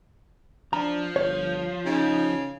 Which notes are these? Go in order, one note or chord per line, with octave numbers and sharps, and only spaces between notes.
F3 D4 A#5
G1 C#5
C#3 D#4